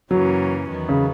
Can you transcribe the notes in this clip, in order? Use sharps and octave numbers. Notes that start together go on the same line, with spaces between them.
F#2 C#3 E3 F#3 A#3 C#4
E2 D#3 F#3 B3
C#3